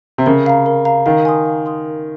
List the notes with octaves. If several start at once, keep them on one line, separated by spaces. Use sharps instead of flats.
C3
C#3 A#4
F5 A#5
A#4
F5 A#5
D#3 F5
G#5 C6 D#6
F5
G#5 C6 D#6
A#4